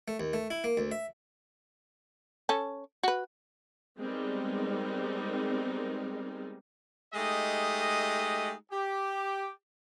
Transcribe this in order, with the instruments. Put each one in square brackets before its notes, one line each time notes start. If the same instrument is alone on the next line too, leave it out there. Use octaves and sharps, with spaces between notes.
[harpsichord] A3
D#2
A3
E4
A#3
D2
E5
[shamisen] C#4 A4
F#4 B4
[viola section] G3 G#3 B3 C4 D#4 A#4
[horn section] G#3 A3 D#4 G4 D#5
G4